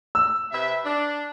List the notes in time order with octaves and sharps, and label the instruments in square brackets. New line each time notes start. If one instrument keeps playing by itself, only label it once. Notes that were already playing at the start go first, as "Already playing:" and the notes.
[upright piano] E6
[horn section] C3 B4 E5
D4